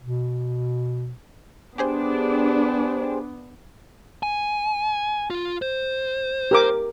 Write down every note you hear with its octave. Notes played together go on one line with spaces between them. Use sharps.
B2
B3 D4 G4 G#4 C5
G#5
F4
C5
G4 A#4 D6